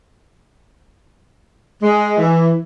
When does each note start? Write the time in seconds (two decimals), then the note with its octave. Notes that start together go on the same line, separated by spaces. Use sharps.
1.82 G#3
2.18 E3